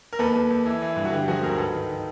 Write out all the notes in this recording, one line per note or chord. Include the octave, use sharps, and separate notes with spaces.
A#4
D#2 A4 B4
D#2
D#2
E3
E3
G2
F#4
D3 G4
F3 F#4 G#4
D2 G#4 A#4
G#2 A4 B4
D#3
D#3